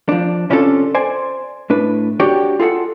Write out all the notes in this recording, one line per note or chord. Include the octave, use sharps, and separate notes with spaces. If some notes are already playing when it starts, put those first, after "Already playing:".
F3 D4
C3 C#4 D4 F4 F#4 A4
C5 D5 G#5
A2 D4 B4
D4 F#4 G4 C#5 D5
F4 G#4 A4 D5 F#5